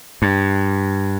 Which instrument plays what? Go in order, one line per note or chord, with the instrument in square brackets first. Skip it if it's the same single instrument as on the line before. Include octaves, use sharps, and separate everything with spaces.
[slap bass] G2